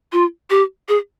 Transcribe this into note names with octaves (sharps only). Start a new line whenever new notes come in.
F4
G4
G#4